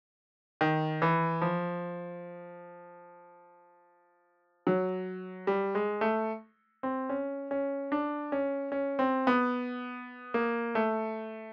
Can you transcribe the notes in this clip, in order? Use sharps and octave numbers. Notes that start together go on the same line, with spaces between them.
D#3
E3
F3
F#3
G3
G#3
A3
C4
C#4
C#4
D4
C#4
C#4
C4
B3
A#3
A3